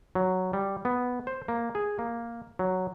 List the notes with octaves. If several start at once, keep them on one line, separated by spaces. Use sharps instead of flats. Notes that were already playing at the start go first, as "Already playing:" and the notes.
F#3
G3
B3
C5
A#3
G#4
A#3
F#3